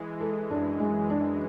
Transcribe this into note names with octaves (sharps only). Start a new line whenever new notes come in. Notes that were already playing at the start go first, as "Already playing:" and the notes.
Already playing: E3 G#3
E3 A4
F#2 D4
G#3
D4